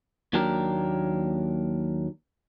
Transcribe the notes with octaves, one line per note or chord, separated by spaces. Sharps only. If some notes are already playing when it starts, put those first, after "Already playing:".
D#2 F#3 A#3 D4 G4 A#4